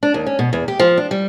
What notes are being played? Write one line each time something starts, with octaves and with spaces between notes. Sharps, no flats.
D4
D#2
C#4
B2
E2
G4
F3
D4
G3